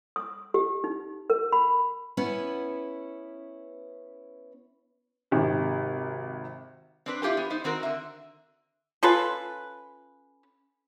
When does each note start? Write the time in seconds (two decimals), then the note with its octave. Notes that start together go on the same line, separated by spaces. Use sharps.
0.16 D#6
0.54 G4
0.84 D#4
1.30 A#4
1.53 B5
2.17 B3 C#4 E4 B4
5.31 G#1 C3 D#3
7.06 C4 D4 B4
7.22 E4 F4 G4 A4 B4
7.37 B3
7.50 D#4 C5
7.64 D#3 C4 F#4 A#4
7.83 D3 E5
9.03 C#4 F4 A4 B4